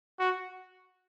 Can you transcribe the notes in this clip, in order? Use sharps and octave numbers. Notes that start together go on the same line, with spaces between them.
F#4